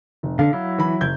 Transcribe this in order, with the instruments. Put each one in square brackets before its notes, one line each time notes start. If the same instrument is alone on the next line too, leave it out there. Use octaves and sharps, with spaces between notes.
[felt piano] F1
[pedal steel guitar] D3 [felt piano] F5
[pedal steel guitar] F#3 E4
[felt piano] E3 B5
F#1 G6 G#6